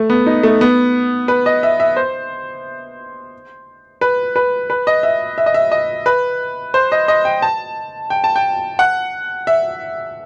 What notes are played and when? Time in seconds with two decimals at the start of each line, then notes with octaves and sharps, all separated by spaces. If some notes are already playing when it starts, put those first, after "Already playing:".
Already playing: A3
0.10 B3
0.26 D#4
0.43 A3
0.61 B3
1.28 B4
1.46 D#5
1.63 E5
1.80 E5
1.96 C5
4.01 B4
4.36 B4
4.70 B4
4.87 D#5
5.03 E5
5.38 E5
5.46 D#5
5.54 E5
5.72 D#5
6.06 B4
6.74 C5
6.92 D#5
7.08 D#5
7.25 G5
7.42 A5
8.10 G5
8.24 A5
8.36 G5
8.79 F#5
9.47 E5